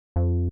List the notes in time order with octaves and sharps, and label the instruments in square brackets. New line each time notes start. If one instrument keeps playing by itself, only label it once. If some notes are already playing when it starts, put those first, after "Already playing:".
[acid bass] F2